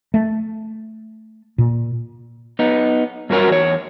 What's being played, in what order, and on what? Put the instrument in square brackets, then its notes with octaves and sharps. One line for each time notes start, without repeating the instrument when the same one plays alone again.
[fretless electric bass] A3
A#2
[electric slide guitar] B3 D#4
G2 F#3 F#4 A#4 C#5
E2 C#5